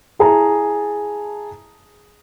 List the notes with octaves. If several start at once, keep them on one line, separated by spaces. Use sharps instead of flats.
E4 G#4 A5 A#5